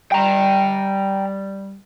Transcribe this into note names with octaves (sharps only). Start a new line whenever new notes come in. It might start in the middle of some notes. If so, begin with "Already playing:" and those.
G3 G5 A#5